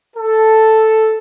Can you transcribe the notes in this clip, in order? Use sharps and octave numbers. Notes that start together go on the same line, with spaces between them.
A4